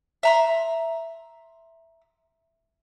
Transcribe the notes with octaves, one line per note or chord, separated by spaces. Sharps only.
E5 A#5 C6